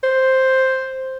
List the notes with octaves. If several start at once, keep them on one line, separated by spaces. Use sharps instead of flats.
C5